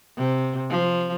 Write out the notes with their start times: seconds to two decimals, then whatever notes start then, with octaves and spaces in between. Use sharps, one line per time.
0.18 C3
0.70 F3